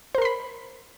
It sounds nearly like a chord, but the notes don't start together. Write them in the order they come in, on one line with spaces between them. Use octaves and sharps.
C5 A#4 C6 B5